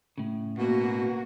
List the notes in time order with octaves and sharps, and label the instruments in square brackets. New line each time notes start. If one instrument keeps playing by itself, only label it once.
[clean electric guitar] A2 C#3
[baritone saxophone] B2 [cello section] A#3 F#4